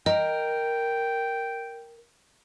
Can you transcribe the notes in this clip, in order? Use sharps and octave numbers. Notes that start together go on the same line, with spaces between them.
A#4 D#5 G5